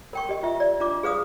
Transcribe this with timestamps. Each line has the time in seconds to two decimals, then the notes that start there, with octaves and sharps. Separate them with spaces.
0.13 A#4 G5 C#6
0.29 G4 D#5
0.43 F4 E5
0.60 D5
0.80 D4 F4 D6
1.03 G#4 B4 F5 D#6